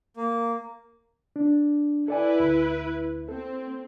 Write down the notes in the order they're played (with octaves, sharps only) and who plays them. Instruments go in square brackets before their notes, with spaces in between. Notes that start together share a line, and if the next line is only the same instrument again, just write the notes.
[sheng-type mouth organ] A#3
[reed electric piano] D4
[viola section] E4 B4 [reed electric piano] A4 D5 G#5
[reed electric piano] D2
[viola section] C4 [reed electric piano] A4